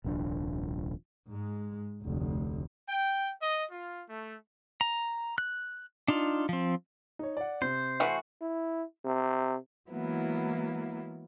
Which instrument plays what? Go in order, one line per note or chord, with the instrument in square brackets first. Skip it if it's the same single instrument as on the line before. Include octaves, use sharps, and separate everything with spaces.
[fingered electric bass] D#1 C2 F3 D4
[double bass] G#2 G#3
F1 D2
[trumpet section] G5
D#5
F4
A3
[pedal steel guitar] A#5
F#6
D4 D#4 F4
F3 C4
[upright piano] D#4 C#5
D5 F#5
[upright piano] C3 [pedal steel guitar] C5
[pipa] E3 A3 F#4
[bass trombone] E4
C3
[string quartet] E3 F#3 G#3 A#3 B3 E4